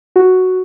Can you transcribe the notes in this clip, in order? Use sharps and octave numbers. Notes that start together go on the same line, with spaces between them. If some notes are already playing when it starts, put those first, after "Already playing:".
F#4